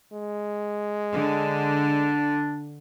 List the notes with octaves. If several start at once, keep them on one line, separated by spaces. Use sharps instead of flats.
G#3
D3 D4